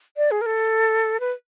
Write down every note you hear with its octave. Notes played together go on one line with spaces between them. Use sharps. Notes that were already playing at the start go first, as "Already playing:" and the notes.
D5
G#4
A#4
A4
B4